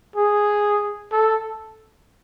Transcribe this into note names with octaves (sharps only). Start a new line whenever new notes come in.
G#4
A4